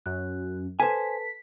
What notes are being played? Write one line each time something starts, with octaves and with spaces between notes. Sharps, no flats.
F#2 F#6
A4 B4 C5 G#5 A5 B6